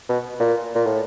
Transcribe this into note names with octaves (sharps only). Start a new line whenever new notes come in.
B2
A#2
A#2
A2